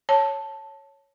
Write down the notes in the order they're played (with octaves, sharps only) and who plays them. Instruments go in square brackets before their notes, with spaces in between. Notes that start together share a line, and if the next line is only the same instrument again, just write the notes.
[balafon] C#5 A5